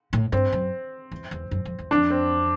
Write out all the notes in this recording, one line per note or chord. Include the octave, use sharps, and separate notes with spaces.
A2
G2 C4
F#2
E2
E2
F#2
F2
E2
F2 D4
C4